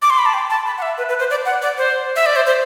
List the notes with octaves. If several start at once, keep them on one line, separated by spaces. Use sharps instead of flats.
D6
C6
B5
A5
G5
A5
B5
F#5
E5
B4
B4
C5
D5
F#5
D5
C5
E5
D5
C5
C5